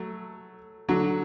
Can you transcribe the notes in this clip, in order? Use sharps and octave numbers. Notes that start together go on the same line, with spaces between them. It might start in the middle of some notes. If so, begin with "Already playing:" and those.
Already playing: F#3 A3
D3 F#3